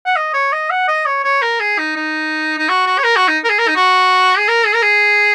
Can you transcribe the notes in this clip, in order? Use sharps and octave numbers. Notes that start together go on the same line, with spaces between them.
F#5
D#5
C#5
D#5
F#5
D#5
C#5
C#5
A#4
G#4
D#4
D#4
D#4
F#4
F#4
C#5
A#4
F#4
D#4
A#4
G#4
A#4
D#4
F#4
G#4
A#4
G#4
A#4
G#4